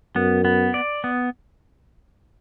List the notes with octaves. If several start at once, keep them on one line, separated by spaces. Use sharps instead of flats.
F#2 B3
B3
D5
B3